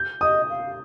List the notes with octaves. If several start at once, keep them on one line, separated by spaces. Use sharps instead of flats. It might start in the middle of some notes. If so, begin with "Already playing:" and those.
Already playing: G6
D#5 D#6
F5